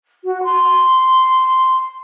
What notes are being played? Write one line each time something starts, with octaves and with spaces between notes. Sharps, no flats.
F#4
C6